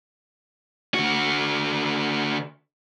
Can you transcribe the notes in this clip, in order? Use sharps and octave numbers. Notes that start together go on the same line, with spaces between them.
D3 F#4